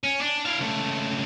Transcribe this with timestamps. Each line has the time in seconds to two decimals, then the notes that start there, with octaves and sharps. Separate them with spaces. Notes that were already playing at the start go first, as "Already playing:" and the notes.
0.04 C#4
0.21 D4
0.46 E4 F5
0.60 C#2 A3